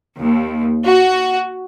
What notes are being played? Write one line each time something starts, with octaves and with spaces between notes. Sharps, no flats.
D#2
F#4